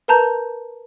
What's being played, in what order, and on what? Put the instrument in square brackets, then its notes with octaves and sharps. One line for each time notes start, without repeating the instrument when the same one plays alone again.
[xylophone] A#4 B4 A5 A#5 G6